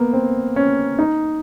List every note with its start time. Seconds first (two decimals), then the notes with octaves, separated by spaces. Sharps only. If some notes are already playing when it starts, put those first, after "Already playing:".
Already playing: A#3 B3
0.13 C4
0.56 C#4
0.99 D#4